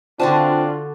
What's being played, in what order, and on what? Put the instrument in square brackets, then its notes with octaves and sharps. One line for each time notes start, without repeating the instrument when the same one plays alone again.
[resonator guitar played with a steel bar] D3 F#4 A5 [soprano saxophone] C4 [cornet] D4 [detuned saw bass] F4